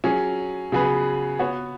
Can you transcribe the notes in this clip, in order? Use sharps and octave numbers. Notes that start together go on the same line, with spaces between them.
F#3 C#4 G#4
C#3 F#3 B3 G#4 B4
B3 F#4 C#5